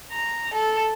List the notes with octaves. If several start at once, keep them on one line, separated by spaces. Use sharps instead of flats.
A#5
A4